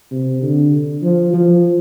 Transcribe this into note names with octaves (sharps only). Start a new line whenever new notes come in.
C3
D3
F3
F3